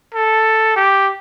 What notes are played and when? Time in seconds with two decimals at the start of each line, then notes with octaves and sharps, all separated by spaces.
0.15 A4
0.76 G4